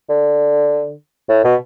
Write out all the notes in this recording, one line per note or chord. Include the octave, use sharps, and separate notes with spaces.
D3
A2
B2